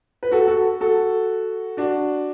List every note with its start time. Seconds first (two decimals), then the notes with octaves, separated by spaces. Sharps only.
0.23 B4
0.31 F#4 A4
0.47 F#4 A4
0.81 F#4 A4
1.77 D4 F#4